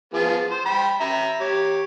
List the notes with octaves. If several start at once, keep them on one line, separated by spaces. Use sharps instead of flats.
F3 B3 G#4
C5
G5 B5
E5 A#5
G4 C#5